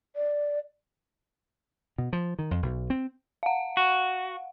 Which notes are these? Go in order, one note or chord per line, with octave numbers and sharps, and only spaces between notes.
D5
B2
F3
D#3
F2
B1
C4
F5 F#5
F#4